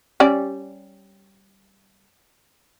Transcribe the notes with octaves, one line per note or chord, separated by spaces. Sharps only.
G3 C#4 D5